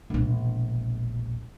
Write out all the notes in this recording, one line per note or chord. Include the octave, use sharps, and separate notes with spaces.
E1 A#1